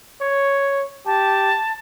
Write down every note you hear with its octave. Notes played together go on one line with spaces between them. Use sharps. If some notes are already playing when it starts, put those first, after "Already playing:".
C#5
G4 A5